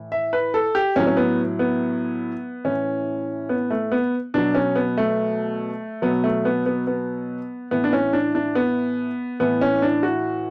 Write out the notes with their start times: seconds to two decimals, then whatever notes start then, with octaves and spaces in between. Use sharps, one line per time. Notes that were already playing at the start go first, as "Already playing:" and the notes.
Already playing: A2 E3
0.12 E5
0.33 B4
0.54 A4
0.75 G4
0.96 A2 C#4
0.99 F#3
1.07 C#4
1.17 B3
1.59 B3
2.64 A2 E3 C#4
3.49 B3
3.70 A3
3.92 B3
4.34 B2 F#3 D4
4.55 C#4
4.76 B3
4.97 A3
6.02 B2 F#3 B3
6.24 A3
6.45 B3
6.66 B3
6.87 B3
7.71 A2 E3 B3
7.84 D4
7.93 C#4
8.13 D4
8.35 D4
8.55 B3
9.40 A2 E3 B3
9.61 C#4
9.82 D4
10.03 F#4